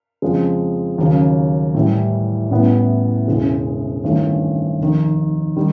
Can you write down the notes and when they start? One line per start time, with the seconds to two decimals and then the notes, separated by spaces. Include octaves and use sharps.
0.22 F2 C#3 F3 G#3
0.98 D#2 C#3 F#3
1.74 A2 E3 G3
2.51 A1 A2 E3 G3 B3
3.28 E1 E2 C#3 E3 G#3
4.04 G#1 G2 E3 A3 C#4
4.80 F1 D#2 D#3
5.56 D#3 G3